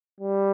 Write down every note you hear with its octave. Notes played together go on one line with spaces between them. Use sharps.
G3